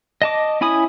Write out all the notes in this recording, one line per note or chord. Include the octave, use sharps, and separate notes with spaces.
D#5 A5 D6
C#4 E4 G#5 B5 D#6